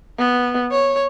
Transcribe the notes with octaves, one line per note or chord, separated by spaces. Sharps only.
B3
C#5